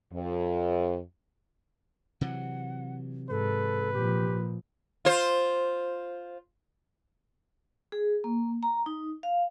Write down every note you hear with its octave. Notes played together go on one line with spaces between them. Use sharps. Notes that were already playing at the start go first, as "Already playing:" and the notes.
F2
C3 E3 F#3 F#5
G#2 A4 B4
A#2 F3 G4
F4 C5
G#4
A#3
A#5
D#4
F5